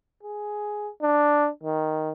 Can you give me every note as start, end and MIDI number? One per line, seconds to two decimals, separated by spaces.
0.23 0.89 68
1.03 1.49 62
1.63 2.13 51